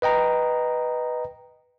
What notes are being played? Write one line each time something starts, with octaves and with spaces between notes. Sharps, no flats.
B4 D#5 G5 A#5